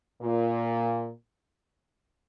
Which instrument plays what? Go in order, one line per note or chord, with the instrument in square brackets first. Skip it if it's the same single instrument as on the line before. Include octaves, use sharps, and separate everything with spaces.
[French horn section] A#2